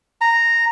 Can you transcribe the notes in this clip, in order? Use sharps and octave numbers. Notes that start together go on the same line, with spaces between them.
A#5